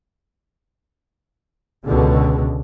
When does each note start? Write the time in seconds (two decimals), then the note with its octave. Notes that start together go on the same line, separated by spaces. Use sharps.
1.85 C#2 B2 D3 G#3